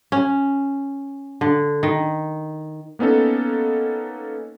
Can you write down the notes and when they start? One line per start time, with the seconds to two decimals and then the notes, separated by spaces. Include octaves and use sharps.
0.12 C#4
1.41 D3
1.83 D#3
2.99 A#3 B3 C#4 D#4 A4